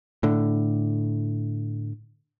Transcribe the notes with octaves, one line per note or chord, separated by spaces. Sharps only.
A2 D3